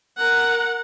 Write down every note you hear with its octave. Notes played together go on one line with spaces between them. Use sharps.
A#4 F#5